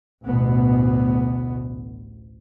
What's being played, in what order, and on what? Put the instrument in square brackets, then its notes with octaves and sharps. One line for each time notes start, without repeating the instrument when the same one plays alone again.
[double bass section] A1 D2 B2 B3